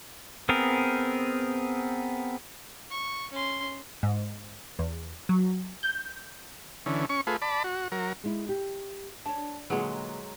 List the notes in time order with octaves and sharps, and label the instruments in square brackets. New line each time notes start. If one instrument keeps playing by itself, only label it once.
[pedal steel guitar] B3 C4 G#4 A#4
[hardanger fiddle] C#6
C#4 C6
[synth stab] G#2
E2
F#3
G6
[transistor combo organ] D3 E3 C#4
C#4 C#6
A3 F4 G#4 B4
D5 A5 B5
F#4
F#3 A#4
[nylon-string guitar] G#3 E4
G4
[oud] D4 [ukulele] C#5 A5
[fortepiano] A#2 D3 B4 [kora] F#3 G#3 [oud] G#4 [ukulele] F#5 A#5